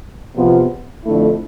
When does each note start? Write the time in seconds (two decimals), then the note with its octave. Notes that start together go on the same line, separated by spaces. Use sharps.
0.34 E2 C3 F3 B3 F4
1.03 F2 D3 A3 E4